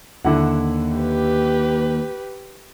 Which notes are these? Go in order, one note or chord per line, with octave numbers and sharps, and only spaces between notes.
D#2 D3 E4 F#5
G4 B4